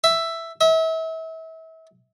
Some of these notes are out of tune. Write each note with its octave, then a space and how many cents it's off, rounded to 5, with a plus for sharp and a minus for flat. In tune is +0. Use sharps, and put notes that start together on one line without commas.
E5 +5
E5 -35